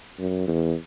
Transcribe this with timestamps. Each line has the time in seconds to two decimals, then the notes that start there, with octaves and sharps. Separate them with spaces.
0.19 F#2
0.48 E2